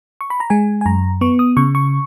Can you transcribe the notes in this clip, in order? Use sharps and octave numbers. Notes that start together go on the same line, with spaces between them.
C#6
B5
A#5
G#3 G#5
G#5
F#2 A#5
B3 C#6
D#6
C#3 C#6
C#6